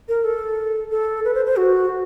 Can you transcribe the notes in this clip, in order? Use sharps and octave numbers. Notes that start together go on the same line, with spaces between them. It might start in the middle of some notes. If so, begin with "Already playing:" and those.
A#4
A4
A4
B4
C5
C5
F#4